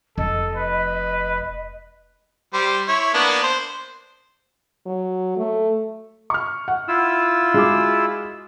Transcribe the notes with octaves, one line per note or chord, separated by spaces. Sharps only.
F1 A4 D#5
B4
G3 C5
E4 C#5
A#3 B3 D4
C5
F#3
A3
C#6 F6
F#5
E4 F4 E6
G#3 F#4 D6